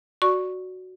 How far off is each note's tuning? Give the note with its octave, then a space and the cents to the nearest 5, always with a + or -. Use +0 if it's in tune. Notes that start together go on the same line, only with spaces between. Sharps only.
F#4 +0 D5 +0 C#6 -5